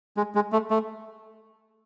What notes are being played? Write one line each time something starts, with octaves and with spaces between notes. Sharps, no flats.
G#3
G#3
A3
A3